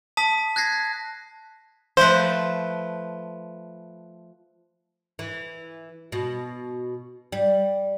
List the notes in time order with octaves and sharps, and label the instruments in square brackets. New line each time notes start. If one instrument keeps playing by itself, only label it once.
[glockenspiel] A5 D#6 B6
F#6 G#6 A#6 C7
[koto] F3 A3 B4 [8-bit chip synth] C5
[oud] E3
B2
G3